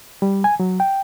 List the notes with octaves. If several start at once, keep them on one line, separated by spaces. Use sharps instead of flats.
G3
G#5
F#3
G5